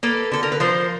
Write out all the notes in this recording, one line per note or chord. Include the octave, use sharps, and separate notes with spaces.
A#3 A4 B4
D3 A4
A#4
B4
F3 A#4 C5